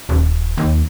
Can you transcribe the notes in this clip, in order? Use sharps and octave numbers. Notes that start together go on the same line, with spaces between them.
D#1
D#2